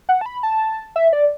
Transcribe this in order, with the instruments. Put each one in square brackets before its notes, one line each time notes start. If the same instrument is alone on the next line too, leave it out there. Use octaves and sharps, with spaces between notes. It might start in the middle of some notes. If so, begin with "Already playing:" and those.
[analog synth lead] F#5
A5
B5
A5
E5
D5